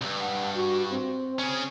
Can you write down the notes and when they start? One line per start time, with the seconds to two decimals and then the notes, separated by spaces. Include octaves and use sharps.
0.01 C2 G2
0.20 F#5
0.55 F#4
0.90 C4
1.39 C#4 G#4